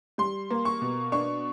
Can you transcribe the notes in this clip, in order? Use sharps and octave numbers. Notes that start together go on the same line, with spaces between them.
G3 C6
A#3
C#6
B2
D4 C#6